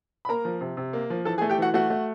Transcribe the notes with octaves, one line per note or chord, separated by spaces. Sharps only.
B5
A#3 A#4 A#5
F3
C3
C3
A#3
F3
E3 A4 A5
G#4 G#5
A3
G4 G5
E3 F#4 F#5
A3 F#4 F#5
A3